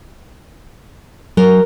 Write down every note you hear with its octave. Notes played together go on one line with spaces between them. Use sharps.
F#3 A#4